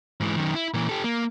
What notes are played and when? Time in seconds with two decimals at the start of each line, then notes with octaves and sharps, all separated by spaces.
0.20 G#2 E3
0.37 F#2 D#3
0.55 E4
0.74 A#2 E3
0.89 G4 A4
1.04 A#3